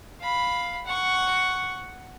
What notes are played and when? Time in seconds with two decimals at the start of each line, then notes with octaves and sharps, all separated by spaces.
0.21 F5 B5
0.86 F#5 C#6